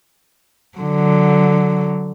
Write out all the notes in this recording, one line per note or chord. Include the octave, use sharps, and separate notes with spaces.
D3 F#3